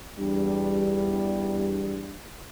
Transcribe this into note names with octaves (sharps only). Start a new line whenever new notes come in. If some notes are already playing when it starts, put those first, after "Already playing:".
E2 G3 D4